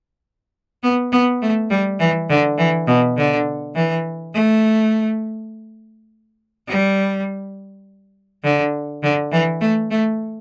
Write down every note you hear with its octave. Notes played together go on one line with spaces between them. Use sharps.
B3
B3
A3
G3
E3
D3
E3
B2
D3
E3
A3
G3
D3
D3
E3
A3
A3